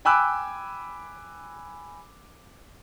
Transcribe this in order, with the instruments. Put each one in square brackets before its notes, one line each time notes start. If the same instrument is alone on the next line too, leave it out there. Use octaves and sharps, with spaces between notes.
[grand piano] G5 G#5 B5 D6 E6 F#6